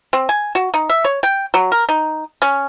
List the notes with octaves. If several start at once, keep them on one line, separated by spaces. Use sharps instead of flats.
C4
G#5
F#4
D#4
E5
C#5
G5
F#3
A#4
D#4
C#4